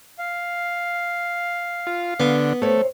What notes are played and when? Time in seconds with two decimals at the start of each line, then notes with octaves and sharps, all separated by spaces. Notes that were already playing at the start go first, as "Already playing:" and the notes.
0.19 F5
1.87 F4
2.20 D3 B3
2.62 A3 C4 C#5